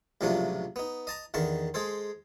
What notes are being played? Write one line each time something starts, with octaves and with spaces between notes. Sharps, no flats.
C#2 A2 C3 F3 F#3 D4
B3 D#4
D#5 A5 A#5
E2 D3 D#3 A5 C#6
G#3 G#4 A4 C5